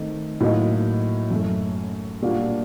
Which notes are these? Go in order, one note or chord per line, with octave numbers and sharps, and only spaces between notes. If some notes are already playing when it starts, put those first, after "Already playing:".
Already playing: D#3 A3 C4 D#4
A2 F#3 A#3 D#4
F#2 F#3 A3
A#2 G3 A#3 D4 F#4